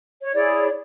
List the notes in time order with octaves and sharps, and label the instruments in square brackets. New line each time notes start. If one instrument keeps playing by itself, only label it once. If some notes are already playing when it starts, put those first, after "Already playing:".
[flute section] C#5
E4 G#4 C#5 D5